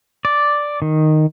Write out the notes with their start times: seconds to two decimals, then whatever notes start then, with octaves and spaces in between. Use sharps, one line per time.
0.25 D5
0.82 D#3